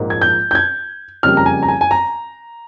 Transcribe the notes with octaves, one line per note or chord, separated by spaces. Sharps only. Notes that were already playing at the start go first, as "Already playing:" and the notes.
Already playing: A#1 G#2 F3 A#3
G#6
G6
G6
G#6
F2 C#3 G3 A#3 F6
A#5
G#5
A#5
G#5
G#5
A#5